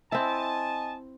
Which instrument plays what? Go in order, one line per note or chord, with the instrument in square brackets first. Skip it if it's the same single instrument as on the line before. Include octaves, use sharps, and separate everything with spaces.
[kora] C4 E4 [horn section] D#5 G#5 A5